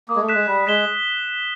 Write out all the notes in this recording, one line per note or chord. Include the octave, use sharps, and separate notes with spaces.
A#3 D#6
G#3
A3
F#6 B6 E7
G#3
G3 F#6
G#3 B6 E7 G7